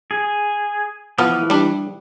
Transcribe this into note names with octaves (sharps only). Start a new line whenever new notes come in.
G#4
E3 F3 B3 D#6 F6
G3 D4